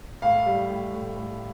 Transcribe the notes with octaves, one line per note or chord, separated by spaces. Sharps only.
A2 F5
G3
A2
A2
A2